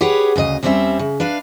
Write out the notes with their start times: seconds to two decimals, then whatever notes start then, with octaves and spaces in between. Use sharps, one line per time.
0.01 G4 G#4 B4 C#5 F#5
0.36 D2 C#3 A4 D#5
0.63 D#2 E3 G3 C4 C#4 E5
0.99 C#3
1.20 D4 B4 F5